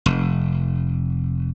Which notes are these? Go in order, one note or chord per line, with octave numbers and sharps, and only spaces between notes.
F1